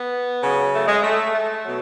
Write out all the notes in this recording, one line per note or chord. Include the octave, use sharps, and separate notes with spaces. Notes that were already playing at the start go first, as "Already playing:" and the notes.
Already playing: B3
C#3 F#3
A3
G#3
A3
A3
B2 F#3